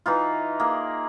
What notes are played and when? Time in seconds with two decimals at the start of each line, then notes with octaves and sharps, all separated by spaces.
0.06 E3 D#4 F4
0.60 A#3 G#4